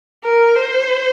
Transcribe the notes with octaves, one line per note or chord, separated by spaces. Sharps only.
A#4
C5